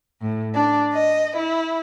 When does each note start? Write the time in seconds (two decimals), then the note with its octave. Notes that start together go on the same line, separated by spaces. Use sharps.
0.21 A2
0.54 D4
0.93 D#5
1.36 E4